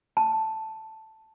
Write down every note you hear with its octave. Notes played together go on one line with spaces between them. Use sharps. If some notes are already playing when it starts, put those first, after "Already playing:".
A5